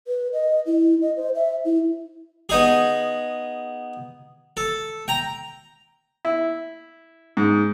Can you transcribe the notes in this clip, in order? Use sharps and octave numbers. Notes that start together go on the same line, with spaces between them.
B4
D#5
E4
D#5
C5
E5
E4
B3 D#4 G#4
A4
G5 A#5
E4
G#2